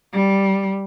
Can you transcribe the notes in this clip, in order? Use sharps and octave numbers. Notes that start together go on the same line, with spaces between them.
G3